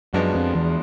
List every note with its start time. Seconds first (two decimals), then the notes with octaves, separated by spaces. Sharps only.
0.13 F#2 F3 G#3 B3 D4 F#4
0.35 F2
0.55 E2